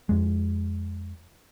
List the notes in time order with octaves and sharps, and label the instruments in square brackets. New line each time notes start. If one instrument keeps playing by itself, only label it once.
[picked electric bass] F2 G#3